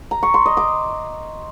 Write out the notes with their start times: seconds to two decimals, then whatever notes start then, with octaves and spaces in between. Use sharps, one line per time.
0.11 A#5
0.23 C#6
0.34 C6
0.46 D#5
0.57 D6